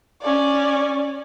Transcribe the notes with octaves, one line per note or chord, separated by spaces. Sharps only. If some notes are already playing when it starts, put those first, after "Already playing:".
C#4 D5